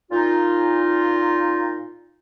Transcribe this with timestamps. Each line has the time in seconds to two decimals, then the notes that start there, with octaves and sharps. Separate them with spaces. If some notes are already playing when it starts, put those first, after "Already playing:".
0.11 A#2 D#4 F4